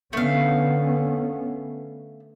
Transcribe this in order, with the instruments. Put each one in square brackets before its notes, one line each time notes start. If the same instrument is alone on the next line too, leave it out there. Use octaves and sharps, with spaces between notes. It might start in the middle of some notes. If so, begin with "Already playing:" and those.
[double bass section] D3 B3 C#4 [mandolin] A3 F5